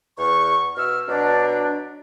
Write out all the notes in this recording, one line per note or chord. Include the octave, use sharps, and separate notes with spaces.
E2 C#6
B2 E6 F6
B2 F#3 D4